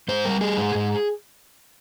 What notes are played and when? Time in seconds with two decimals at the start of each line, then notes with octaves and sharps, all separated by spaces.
0.08 G#2 C5
0.25 G3 A#4
0.41 G3 G#4
0.58 G#2
0.75 G#2